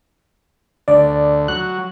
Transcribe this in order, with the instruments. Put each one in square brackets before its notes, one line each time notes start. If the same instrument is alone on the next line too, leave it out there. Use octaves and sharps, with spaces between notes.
[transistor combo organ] D2 [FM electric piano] D5
[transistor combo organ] F#3 [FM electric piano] F#6